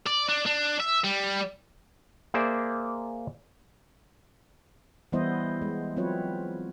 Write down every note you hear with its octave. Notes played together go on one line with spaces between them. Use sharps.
D5
D4
D4
E5
G3
A#3 G#4 C5 D5 E5
E3 G3 B3 E4 C5 D#5
G#3
F#3 C4 F4 B4 C#5